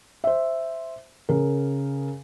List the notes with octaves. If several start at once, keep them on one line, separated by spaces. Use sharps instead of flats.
C5 E5
C#3 A#4